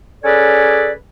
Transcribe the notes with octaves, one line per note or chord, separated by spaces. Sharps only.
C#4 G#4 A4 B4 C#5 D5